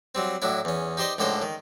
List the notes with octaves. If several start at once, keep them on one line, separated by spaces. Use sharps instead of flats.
F#3 G3 C4
A2 F#3 D4 E4
E2 C#4
D#4 G4 C5 D5 D#5
C#2 A2 D3 A4 C5 A#5
D#3